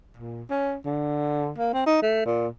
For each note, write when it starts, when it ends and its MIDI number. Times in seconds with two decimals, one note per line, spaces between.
0.17 0.43 46
0.50 0.76 61
0.85 1.51 50
1.58 1.73 58
1.74 1.85 60
1.86 1.98 63
2.02 2.25 57
2.26 2.48 46